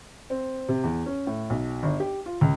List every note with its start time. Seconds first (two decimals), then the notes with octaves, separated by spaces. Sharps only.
0.30 C4
0.69 C3
0.84 E2
1.06 C#4
1.27 A2
1.50 B1
1.83 G1
2.00 G4
2.26 F4
2.41 C#2